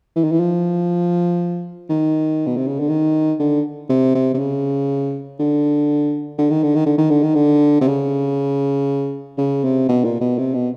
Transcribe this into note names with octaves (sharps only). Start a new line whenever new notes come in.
E3
D#3
E3
F3
D#3
B2
C3
C#3
D3
D#3
D3
C3
C3
C3
C#3
D3
D3
D#3
D3
D#3
D3
D#3
D3
D#3
D3
C3
C#3
C#3
C3
B2
A#2
B2
C3
B2